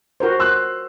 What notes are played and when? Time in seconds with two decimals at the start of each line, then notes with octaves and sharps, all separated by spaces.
0.20 F#4 A#4 C5
0.39 C6 E6 F#6